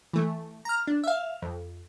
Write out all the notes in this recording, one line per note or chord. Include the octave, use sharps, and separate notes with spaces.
E3 A3
A#5 F6
D4
E5 F5
F2